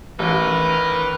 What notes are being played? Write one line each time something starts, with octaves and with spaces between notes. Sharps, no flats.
A1 D#4 A#4 B4